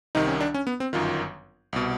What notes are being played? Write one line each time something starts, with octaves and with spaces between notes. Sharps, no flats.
C2 C3 D#3 D#4
C#4
D4
C#4
B3
C4
G1 F#2 D#3 F4
C2 B2